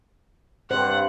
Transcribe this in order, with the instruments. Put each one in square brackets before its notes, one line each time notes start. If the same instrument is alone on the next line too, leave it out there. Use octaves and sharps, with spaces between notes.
[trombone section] G2 [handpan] C5 [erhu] F#5